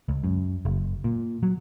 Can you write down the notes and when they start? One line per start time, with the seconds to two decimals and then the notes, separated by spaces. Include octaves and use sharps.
0.09 C#2
0.24 F#2
0.65 F#1
1.04 A#2
1.43 F#3